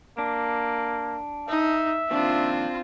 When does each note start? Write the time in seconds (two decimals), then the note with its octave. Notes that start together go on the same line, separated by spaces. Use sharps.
0.18 A#3 D4
1.48 D#4 E5
2.11 A#2 D#3 F3 C4 D4 F4